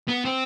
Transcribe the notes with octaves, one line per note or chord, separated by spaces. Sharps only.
B3
C4